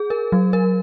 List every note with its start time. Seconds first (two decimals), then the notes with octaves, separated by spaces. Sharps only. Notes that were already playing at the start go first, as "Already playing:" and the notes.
Already playing: G#4
0.10 A#4
0.32 F#3
0.53 A#4